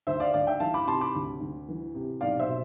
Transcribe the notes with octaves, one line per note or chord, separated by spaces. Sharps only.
D2 C5 E5
D5 F5
D2 D5 F5
E5 G5
E3 F5 A5
B5 D6
C3 A5 C6
B5 D6
D2
D2
E3
C3
B1 D5 F5
C5 E5
B2